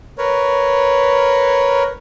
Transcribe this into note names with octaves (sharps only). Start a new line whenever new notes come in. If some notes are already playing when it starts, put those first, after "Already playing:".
A#4 B4 C#5